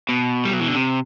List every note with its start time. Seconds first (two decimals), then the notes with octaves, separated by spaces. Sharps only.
0.09 B2
0.45 G3
0.53 F#3
0.60 E3
0.68 D3
0.75 C3